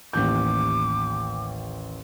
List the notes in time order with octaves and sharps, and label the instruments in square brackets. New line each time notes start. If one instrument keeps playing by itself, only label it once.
[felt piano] A1 D#2 G6 [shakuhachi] D6